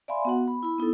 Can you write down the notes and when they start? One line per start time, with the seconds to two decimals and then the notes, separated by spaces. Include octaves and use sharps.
0.08 D5 E5 F5 G#5 B5 C6
0.25 B3 F#4 F#5
0.48 B5
0.63 E4 B5
0.78 B3 D#4 E4 A4